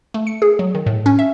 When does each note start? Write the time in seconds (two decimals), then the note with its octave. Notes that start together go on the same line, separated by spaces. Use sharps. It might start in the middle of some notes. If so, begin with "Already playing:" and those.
0.14 A3
0.27 C#7
0.42 G#4
0.59 F#3
0.75 D#3
0.86 A2
1.06 C#4
1.19 E5